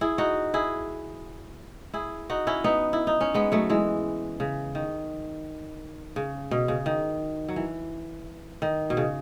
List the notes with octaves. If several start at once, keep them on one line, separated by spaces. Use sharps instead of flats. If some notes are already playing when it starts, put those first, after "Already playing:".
E4 G#4
D#4 F#4
E4 G#4
E4 G#4
D#4 F#4
C#4 E4
B3 D#4
E4
D#4
C#4
G#3 B3
F#3 A3
E3 G#3
C#3
D#3
C#3
B2
C#3
D#3
F#3
E3
D#3
B2
C#3